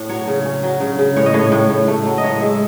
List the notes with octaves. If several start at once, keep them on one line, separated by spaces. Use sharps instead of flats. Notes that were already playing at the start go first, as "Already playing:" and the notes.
Already playing: A2 A3
F#3 C#5
C#3
C#4
F#3
C#3
C#3
A2 C#5
D#5
A2 C#5
A2
A2
A3
F#3
D#5
A2 C#5
G#3 E5